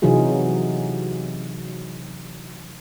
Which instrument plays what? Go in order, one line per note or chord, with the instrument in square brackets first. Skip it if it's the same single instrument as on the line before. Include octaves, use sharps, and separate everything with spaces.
[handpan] C3 E3 F#3 D#4 F4 G#4